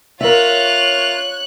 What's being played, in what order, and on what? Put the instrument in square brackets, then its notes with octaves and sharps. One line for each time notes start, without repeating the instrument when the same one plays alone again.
[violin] F4 F7 [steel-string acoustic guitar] A#4 E5 [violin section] C#5 F#6